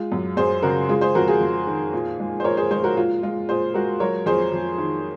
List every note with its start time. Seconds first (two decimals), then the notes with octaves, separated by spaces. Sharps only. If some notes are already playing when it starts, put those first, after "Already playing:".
Already playing: G#3 F4
0.12 F#2
0.37 F#2 G#4 C5
0.62 C#3 F#4 A#4
0.89 G#3 F4 G#4
1.01 G#4 C5
1.15 F2 F#4 A#4
1.28 F4 G#4
1.41 F2
1.67 D#3
1.93 A#2
2.19 G#3
2.40 C5
2.44 A#2 A#4 C#5
2.57 G#4 C5
2.71 G#3 G#4 C5
2.84 F#4 A#4
2.97 A#2 F4
3.23 G#3 F4
3.49 A#2 G#4 C5
3.74 G#3 F#4 A#4
4.00 F#3 A#4 C#5
4.26 F2 G#4 C5
4.52 F2
4.78 D#3